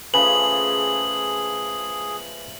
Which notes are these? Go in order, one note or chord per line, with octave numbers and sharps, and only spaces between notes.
C#3 F3 A3 G#4 B4 G#5 B5 F#7